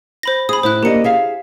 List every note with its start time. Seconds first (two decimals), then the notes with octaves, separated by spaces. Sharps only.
0.23 C5 B5 A#6
0.49 G#4 B5 D#6
0.63 A2 E4 C5 F#6
0.83 A#3 D4 G4 D#5 C#7
1.04 G#4 E5 F5